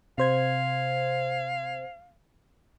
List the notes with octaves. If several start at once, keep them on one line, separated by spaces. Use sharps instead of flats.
C3 C5 F5 G#6